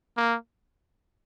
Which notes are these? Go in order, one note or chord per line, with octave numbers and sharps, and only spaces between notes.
A#3